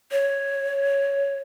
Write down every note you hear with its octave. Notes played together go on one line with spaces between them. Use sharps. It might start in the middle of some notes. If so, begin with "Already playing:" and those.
C#5